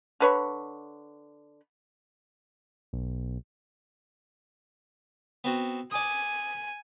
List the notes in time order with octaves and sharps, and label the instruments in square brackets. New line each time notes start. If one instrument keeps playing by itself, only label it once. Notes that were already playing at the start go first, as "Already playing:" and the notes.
[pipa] D3 B4 C#5 B5
[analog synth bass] B1
[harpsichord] B3 C4 F#4
[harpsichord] D5 D#6 [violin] G#5